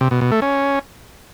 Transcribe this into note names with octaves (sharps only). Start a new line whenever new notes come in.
C3
B2
B2
A3
C#4